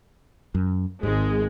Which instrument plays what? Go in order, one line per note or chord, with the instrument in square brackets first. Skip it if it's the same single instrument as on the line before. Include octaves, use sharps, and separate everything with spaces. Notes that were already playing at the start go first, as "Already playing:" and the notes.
[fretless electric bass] F#2
[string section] G#1 G#3 [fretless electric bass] G#2